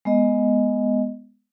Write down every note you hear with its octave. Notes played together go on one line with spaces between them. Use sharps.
G#3 B3 D#5